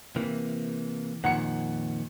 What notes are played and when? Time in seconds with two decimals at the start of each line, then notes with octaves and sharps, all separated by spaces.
0.16 C3 E3 A#3
1.24 F2 A#2 D#3 F#5 C#7